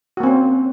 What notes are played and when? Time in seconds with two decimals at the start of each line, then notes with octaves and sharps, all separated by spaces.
0.17 F#4
0.20 A#3
0.23 C4
0.26 C#4